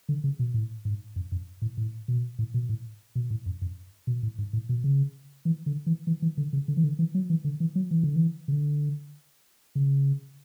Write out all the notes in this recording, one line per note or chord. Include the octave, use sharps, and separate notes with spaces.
D3
C#3
B2
A2
G#2
F#2
F#2
A2
A2
B2
A2
B2
A2
B2
A2
F#2
F#2
B2
A2
G#2
A2
B2
C#3
E3
D3
E3
E3
E3
D3
C#3
D3
E3
D3
E3
F#3
E3
D3
E3
F#3
E3
D3
E3
C#3
D3
C#3